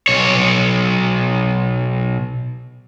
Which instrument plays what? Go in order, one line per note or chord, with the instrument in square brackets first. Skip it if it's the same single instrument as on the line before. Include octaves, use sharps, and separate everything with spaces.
[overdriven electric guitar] B1 C#5